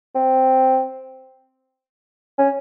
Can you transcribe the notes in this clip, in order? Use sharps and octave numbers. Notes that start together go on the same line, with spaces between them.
C4
C#4